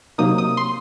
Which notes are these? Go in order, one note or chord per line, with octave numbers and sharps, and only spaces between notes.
C3 F#3 A#3 D#4 D#6
D#6
C6